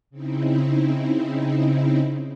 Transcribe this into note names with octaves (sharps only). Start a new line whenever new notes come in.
C#3 C4 D#4 E4